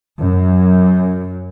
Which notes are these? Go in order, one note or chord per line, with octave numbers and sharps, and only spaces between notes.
F#2